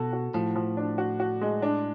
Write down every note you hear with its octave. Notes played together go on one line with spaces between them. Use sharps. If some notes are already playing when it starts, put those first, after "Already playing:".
Already playing: B2 F#4 A4
F#4
A2 F3
F3
D4
F#4
F#4
G#3
D4